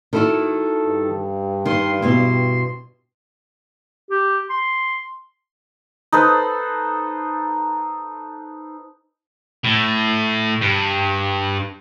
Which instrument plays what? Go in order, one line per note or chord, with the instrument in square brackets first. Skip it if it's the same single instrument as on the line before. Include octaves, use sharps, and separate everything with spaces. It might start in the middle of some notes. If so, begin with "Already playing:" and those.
[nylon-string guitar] D#3 E4 F#4 [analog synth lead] A4
[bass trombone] G2
[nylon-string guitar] D#3 [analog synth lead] C6
[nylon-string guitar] B2 C4 E4 [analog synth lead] C6
[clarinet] G4
C6
[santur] D#4 A4 B4 C5
[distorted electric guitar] A2
G2